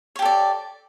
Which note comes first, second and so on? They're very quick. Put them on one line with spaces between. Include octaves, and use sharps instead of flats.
C#5 G4 A4 D5